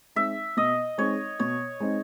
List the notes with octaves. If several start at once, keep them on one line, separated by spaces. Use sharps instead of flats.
G#3 C4 D#4 E5
B2 D#5
G#3 C4 D#4 C#5
B2 C#5
G#3 C4 D#4